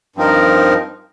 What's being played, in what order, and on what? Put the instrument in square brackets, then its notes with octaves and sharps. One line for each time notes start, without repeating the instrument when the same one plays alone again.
[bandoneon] G2 F3 C4 D#4 A#4